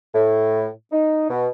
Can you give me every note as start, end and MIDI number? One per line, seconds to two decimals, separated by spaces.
0.14 0.68 45
0.91 1.27 63
1.29 1.47 47